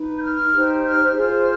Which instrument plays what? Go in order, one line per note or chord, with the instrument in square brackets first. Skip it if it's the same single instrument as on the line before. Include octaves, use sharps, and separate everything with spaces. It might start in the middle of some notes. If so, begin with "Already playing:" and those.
Already playing: [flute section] D#4 B4
G6
F6
D#4 G4 C5
F6
F4 G#4 C5 F6